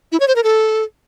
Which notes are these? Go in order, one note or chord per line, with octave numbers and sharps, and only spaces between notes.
E4
C#5
C5
A#4
A4